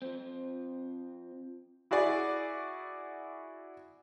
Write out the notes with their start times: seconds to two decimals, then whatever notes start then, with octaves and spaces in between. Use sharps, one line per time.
0.02 F3 C4
1.91 E4 F#4 G#4 D5